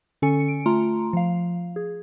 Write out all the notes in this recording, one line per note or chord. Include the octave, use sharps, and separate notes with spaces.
D3 C#4 A4 G#5 C#7
D7
A3 F4 A#5 C6
F3 F5
G#4